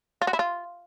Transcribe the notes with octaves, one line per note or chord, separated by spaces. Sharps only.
F4
F#4
E4
F4